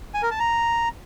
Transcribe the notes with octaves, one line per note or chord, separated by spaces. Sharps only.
G#5
A#4
A5
A#5